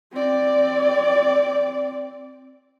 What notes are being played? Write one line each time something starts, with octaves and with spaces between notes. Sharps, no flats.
C4 D5